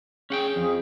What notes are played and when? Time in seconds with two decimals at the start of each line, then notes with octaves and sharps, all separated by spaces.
0.30 C#4 G#4 F#5 G5
0.56 F2